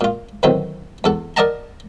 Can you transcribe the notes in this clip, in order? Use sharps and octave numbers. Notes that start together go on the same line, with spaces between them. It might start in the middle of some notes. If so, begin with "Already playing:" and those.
A#2 F4
A2 D3 D#3 F#3 B3 C4
E2 A4 F#5
A#4 D5 D#5 F#5 A5 A#5